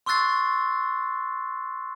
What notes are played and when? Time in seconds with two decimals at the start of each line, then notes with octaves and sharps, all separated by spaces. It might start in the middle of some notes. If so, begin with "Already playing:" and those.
0.06 C6 C#6 E6 F#6 A6 C7